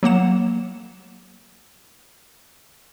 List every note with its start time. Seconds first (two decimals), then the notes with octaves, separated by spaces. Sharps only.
0.03 F#3 A#3 F#5 E7